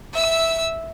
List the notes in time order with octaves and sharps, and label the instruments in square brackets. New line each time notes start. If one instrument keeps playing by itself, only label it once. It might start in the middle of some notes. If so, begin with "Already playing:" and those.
[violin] E5 E6